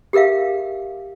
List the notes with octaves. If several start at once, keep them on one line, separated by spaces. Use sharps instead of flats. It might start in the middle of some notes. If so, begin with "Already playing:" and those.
G4 G#4 A#4 E5 F5